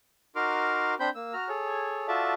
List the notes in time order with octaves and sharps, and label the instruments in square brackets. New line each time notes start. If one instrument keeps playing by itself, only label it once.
[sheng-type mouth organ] D#4 F#4 A#4 C6 D6 F6
C4 D4 C5 B5 G6
A#3 E6
F#4 A#5 F6
G#4 A4 C#5
F4 F#4 A4 D5 E5 A5